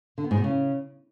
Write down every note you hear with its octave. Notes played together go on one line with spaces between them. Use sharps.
D3
B3
G#2
B2
C#3